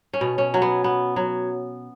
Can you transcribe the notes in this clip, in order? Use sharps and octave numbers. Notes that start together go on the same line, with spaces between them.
C#4
B2
C#4
F#3
B3
B3
F#3